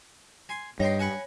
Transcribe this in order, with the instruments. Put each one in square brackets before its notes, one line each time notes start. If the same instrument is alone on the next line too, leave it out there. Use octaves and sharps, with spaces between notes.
[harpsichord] G#5 C6
[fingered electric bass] G2 [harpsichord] D#4 G5 C6 [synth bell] C#5
[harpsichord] B4 F#5 G#5